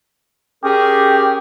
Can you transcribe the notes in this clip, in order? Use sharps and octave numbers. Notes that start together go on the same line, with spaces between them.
C#4 G4 G#4 A#4